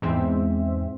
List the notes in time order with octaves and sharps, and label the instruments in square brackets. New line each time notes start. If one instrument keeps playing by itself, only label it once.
[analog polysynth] E2 G#2 C4 E5